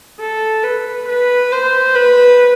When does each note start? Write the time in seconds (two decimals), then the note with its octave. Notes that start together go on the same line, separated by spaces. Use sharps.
0.20 A4
0.64 B4
1.08 B4
1.52 C5
1.95 B4